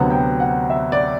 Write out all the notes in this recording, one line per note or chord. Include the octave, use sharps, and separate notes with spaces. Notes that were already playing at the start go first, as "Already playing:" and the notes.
Already playing: D2 C3 F#3 B3 F#5
G5
F#5
E5
D5